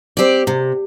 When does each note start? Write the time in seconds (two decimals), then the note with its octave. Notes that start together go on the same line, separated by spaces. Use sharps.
0.17 C4 G4 D5
0.47 C3